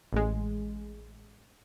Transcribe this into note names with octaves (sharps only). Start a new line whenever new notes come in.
A1 G#3